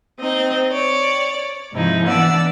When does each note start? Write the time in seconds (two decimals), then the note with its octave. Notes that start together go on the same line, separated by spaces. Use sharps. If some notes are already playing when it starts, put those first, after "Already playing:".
0.20 C4 D#4 D#5
0.71 C#5 D5
1.72 G#2 C3 F3 D#4 E4
2.06 E3 B3 D4 D5 F#5 E6